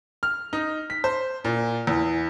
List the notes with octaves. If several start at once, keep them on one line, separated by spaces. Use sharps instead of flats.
F6
D#4
B6
C5
A#2
E2